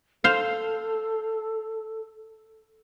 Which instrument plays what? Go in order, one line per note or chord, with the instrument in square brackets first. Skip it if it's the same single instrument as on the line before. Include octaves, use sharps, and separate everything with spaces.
[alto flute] A4 [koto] C5 F5